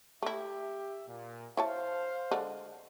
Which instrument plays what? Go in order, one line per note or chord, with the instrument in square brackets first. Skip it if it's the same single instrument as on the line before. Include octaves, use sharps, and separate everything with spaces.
[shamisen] A3 E4 [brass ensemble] G4 E5
[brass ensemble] A#2
[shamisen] E4 C#5 A5 [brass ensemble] C5 F5
[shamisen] D3 G#3 F#5